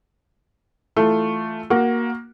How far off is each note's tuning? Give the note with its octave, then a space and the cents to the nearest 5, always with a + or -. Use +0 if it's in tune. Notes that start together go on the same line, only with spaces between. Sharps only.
E3 +0 A3 +0 F4 +0
A#3 +10 F#4 +0